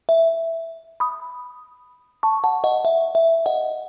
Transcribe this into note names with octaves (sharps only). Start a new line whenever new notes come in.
E5
B5 D#6
A5 C#6
F#5 A5
D#5 F#5
E5
E5
D#5 F#5